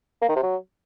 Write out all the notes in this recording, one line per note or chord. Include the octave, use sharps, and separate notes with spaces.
A#3
D#3
C3
F#3